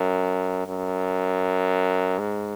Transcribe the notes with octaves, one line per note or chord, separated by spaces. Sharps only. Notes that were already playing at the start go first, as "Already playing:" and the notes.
Already playing: F#2
F#2
G#2